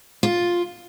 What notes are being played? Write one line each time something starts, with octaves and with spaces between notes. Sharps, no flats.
F4